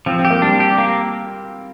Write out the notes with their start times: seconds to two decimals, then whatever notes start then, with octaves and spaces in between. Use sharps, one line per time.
0.06 F3 C4
0.19 C4
0.25 G4
0.30 A#3
0.42 G3 D4
0.60 G4
0.78 A#3